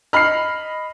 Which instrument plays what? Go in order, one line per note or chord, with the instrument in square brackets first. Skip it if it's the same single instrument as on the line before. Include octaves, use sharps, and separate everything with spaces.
[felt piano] D#5 B5 [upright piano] F6 C7